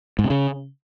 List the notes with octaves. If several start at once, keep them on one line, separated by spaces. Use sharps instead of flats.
G#2
C3
C#3